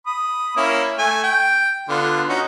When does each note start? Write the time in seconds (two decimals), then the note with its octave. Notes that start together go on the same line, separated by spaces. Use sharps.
0.07 B5 D#6
0.57 A#3 C#4 E4
0.98 A3 G#5
1.23 G5
1.89 D3 B3 F4
2.29 C#4 D#4 F#4